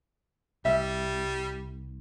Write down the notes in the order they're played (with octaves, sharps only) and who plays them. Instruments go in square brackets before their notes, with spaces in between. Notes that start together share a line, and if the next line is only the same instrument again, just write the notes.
[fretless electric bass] C2 [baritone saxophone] G3 [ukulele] E5